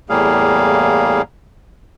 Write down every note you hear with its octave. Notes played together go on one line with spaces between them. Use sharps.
E2 A2 G3 A#3 G#4 F5